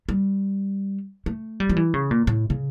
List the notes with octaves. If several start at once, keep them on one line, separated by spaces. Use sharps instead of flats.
G3
A3
G3
F3
E3
C#3
A#2
A2
C#3